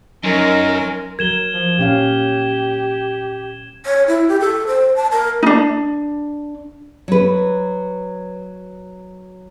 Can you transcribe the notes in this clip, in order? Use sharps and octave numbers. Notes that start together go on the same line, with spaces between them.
F#2 C#4 D#4 A#4 G#5 C6
F#3 A#4 G#6 E7 G7
F3
A#2 C#4 G4 F5
C#5
E4
G4
A4
C5
A5
A#4
D4 D#4
F#3 B4